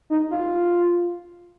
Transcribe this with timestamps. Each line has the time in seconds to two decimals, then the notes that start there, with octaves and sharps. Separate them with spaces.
0.10 D#4
0.31 F4